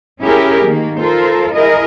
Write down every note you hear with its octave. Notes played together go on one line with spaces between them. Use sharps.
C#4 E4 G4 G#4 A#4
D#3 A#3
F4 A4 A#4 C5
E4 G#4 A#4 D#5